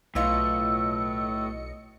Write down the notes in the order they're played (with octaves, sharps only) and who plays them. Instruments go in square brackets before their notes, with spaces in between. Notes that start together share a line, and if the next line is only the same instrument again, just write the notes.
[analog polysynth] B1 D#5 C#7 [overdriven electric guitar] A2 [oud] B3 E4 F4 [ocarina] E6